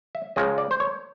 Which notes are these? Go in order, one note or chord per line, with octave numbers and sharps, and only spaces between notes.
E5
C#2 C#3 F3 G#3 D#5
D5
C5
C#5